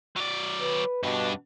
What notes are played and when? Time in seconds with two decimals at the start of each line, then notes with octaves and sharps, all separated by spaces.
0.16 F#3 D5
0.61 B4
1.03 G2 B2 D4